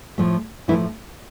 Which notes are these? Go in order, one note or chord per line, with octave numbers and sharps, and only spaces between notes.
A2 F3 A3
A2 E3 F3 A3 E4